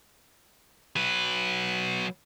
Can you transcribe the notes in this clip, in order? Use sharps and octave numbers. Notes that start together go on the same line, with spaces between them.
F#3 B4